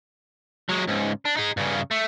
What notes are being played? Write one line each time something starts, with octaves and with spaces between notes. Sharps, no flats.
F#3 G#3
C#2 G#2
D4
D#4 G#4
G2 C#3
A3